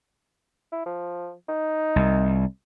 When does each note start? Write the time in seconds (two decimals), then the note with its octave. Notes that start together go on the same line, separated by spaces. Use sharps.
0.72 E4
0.86 F3
1.49 D#4
1.96 C2